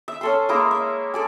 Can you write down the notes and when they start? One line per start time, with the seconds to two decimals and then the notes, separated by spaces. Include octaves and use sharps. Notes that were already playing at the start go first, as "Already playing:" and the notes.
0.08 E5
0.21 C#4 A4 C6
0.49 G#3 A#3 E4 A#4
0.71 E5
1.14 A4 D5 G#5